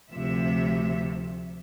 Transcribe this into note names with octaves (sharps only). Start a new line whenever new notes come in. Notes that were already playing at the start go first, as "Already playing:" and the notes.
D2 C3 F3 E5